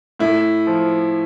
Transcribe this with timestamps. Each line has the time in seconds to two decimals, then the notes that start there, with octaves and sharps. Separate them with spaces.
0.19 A2 E4
0.67 F3